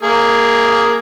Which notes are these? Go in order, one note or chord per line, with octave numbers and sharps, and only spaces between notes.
A#3 G#4